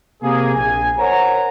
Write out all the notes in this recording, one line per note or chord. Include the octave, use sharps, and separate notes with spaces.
C3 A#3 G#4
A#1 G#5
A#4 C5 C#5 F#5 G#5 A#5